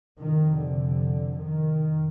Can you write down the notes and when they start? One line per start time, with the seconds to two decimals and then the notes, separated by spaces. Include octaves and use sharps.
0.19 F2 C3 D#3
0.59 D3
1.39 D#3
1.80 F2